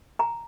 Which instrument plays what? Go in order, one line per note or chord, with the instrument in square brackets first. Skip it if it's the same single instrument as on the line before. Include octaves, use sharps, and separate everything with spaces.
[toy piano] G#5 A#5